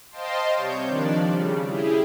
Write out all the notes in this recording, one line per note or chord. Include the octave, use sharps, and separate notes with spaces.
C5 D#5 F5 G5 A5 C6
C3 G3 C#5 G6
D#3 F3 D4 D5
C#3 G3
E4 G4 G#4